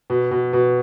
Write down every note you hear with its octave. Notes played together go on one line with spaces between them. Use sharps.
B2
B2
B2